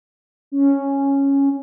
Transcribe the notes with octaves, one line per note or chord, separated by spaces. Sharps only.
C#4